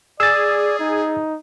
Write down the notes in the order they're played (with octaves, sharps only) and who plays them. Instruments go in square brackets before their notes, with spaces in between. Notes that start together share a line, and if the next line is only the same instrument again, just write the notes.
[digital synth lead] G#4 [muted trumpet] D5 [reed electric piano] E6 A6
[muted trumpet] D#4